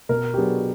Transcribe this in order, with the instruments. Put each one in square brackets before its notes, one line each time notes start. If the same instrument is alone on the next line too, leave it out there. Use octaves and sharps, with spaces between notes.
[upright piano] B2 [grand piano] A#4
[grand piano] G4
[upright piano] F#3 B3 D4 [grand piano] G#4